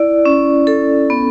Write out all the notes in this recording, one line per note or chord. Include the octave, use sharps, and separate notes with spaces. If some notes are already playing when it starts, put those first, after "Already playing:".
Already playing: E4 D5
C#4
A4
B3